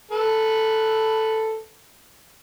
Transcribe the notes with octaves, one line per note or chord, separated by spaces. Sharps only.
A4 B4